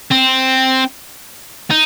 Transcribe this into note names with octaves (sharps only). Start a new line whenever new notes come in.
C4
D#4